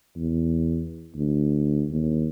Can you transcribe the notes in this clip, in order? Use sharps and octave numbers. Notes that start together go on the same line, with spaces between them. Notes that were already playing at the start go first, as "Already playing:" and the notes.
E2
D2
D#2